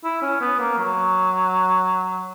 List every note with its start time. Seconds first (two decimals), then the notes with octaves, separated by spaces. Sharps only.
0.04 E4
0.22 C#4
0.41 B3
0.59 A#3
0.79 F#3